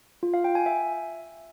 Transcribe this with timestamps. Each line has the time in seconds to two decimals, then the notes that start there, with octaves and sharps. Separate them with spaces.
0.23 F4
0.34 F5
0.44 G5
0.55 G#5
0.66 E5